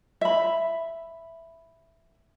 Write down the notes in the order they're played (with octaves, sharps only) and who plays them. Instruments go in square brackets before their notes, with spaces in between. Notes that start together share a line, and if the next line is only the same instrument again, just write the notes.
[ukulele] E5 B5